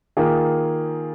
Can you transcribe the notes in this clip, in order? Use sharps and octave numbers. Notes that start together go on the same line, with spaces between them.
D#3 A#3 F4 G#4